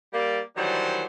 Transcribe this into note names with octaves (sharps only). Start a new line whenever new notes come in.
G3 A#3 D5
D#3 E3 F#3 G3 D4 C5